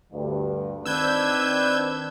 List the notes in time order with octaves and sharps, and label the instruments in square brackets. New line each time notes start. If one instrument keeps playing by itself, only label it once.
[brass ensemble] D2 G2
[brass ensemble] D#3 C4 [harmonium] D4 B4 [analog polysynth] E6 G6 G#6